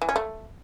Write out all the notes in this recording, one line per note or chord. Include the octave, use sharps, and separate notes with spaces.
E3
C#4
A3